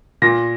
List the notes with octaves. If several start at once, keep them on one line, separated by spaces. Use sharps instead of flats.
A#2 A#6